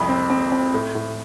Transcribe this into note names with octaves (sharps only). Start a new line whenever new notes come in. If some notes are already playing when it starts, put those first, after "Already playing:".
Already playing: C2 F2 B5
C4
C4
C4
A2
A2